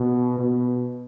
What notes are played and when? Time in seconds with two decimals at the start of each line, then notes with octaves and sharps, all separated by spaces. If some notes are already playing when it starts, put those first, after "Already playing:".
Already playing: B2
0.38 B2